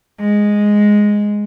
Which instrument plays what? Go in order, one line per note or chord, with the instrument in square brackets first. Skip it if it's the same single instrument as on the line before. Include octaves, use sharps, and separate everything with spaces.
[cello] G#3